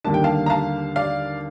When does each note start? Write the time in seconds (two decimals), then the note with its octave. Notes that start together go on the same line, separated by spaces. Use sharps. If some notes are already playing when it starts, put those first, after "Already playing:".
0.05 D#2 D3 G3 A#3 D4 A5
0.14 G5
0.24 F5 A5
0.46 A#5
0.50 F5 A5
0.96 D5 F5